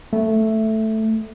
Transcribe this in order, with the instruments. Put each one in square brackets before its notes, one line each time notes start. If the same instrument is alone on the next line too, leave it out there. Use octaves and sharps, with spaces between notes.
[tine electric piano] A3